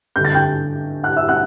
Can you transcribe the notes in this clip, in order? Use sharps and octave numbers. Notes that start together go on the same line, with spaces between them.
G2 D3 G6
A6
G5 G6
F#5 F#6
E5 E6
F#5 F#6